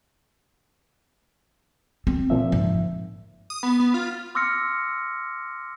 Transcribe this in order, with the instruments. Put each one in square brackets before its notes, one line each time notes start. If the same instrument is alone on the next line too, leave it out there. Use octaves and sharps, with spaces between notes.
[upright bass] C4
[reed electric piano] A#2 F3 E5
[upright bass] G#2
[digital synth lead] D#6
B3
B3
F4
[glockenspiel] C6 D6 E6 F6 A#6 C#7